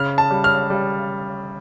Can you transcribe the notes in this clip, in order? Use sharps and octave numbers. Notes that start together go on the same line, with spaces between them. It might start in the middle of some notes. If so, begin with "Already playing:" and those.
Already playing: C#3 F6
A5
G3
F6
G3